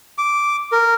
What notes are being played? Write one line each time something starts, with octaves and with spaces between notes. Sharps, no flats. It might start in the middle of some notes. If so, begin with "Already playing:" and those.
D6
A#4